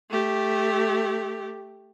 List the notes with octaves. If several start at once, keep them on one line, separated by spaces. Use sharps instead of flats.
A3 G4